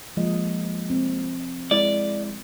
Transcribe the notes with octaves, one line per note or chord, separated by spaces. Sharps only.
F3 G#3 A#3 D#5
C4
G#3 E4 D5